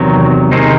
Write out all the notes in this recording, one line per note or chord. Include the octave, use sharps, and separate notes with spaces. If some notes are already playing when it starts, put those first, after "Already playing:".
Already playing: E2 C3 D#3 F#3
C3 D#3 G#3 C4 D#4